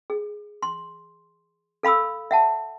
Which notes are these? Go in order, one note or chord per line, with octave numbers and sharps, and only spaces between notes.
G#4
C6
A4 F5 B5 D#6 E6
E5 F#5 A5